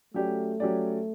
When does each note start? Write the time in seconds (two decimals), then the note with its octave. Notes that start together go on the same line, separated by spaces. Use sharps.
0.14 F#3 A3 C#4 G4 D5
0.60 F#3 C#4 G4 D5